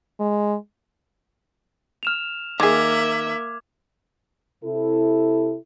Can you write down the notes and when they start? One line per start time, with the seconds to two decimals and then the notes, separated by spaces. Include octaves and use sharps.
0.20 G#3
2.03 F6 E7 F7
2.60 D#3 A#3 G#4 E5 D6 G#6
4.64 C3 E4 A4